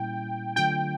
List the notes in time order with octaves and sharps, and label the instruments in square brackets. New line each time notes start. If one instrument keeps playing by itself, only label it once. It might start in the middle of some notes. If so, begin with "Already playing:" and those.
Already playing: [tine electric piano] A#2 G3 A#3 C#4 E4 [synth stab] G5
[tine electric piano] D3 F#3 A3 D4 F4 [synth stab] G5